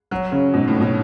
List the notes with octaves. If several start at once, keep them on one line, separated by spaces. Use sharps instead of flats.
F#3 F#4
C#3 C#4
G#2 B2
A2
G#2
B2